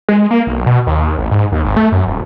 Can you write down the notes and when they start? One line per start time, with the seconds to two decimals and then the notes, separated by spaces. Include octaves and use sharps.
0.09 G#3
0.31 A#3
0.47 B1
0.66 B2
0.87 D#2
1.18 A1
1.31 G#2
1.52 D#2
1.64 G#1
1.77 A3
1.92 F#2
2.07 D#1